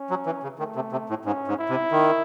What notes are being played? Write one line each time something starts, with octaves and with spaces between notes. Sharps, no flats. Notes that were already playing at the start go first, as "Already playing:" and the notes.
Already playing: C#4
F#3
E3
C#3
D#3 A3
C3
C3
A2
G#2 C#4
G#2
E4
C3
D#3